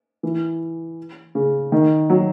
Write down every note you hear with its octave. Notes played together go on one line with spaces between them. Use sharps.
E3
C#3
D#3
F#3